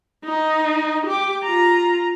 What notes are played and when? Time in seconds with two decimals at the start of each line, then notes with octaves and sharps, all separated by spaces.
0.25 D#4
1.06 G4 D6
1.43 F4 A#5